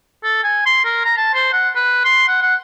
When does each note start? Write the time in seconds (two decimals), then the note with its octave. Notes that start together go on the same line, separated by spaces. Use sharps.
0.24 A4
0.44 G#5
0.66 C6
0.85 A#4
1.05 A#5
1.17 A5
1.34 C5
1.53 F#5
1.75 B4
2.05 C6
2.28 F#5
2.42 F#5